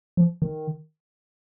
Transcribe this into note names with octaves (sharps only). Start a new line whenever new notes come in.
F3
D#3